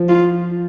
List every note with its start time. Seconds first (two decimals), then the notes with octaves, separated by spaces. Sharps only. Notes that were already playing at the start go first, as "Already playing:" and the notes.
Already playing: F3
0.09 F4